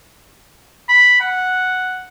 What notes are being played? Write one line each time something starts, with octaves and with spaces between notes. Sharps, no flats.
B5
F#5